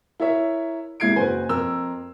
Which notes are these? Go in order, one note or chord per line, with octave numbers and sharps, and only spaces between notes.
E4 A#4 C#5 E5
C2 G#2 E4 G#6 C7 D7
F#1 F#4 B4 C5 G#5
F2 A#4 E6